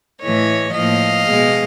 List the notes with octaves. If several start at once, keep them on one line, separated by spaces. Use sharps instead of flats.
A2 E3 A3 C#5 D#5
A2 F3 A#3 D#5 F5
B2 G#3